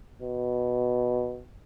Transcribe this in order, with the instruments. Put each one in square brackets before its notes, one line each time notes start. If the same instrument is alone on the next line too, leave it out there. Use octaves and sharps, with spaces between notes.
[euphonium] B2